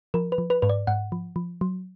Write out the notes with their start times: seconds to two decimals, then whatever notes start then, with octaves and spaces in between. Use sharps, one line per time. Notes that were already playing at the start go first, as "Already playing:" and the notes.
0.14 F3 A#4
0.32 B4
0.38 F3
0.50 B4
0.62 G#2 B4
0.69 D5
0.87 G#2 F#5
1.12 F3
1.36 F3
1.61 F#3